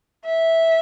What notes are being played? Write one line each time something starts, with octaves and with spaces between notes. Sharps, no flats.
E5